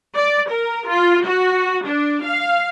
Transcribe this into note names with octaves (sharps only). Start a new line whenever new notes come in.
D5
A#4
F4
F#4
D4
F5